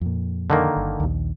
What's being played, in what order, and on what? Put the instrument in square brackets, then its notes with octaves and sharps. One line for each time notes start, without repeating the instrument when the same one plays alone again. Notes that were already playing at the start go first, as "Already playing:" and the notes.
[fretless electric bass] F2 A#2
[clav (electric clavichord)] D3 D#3 A#3
[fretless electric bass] G1
A#1 D#2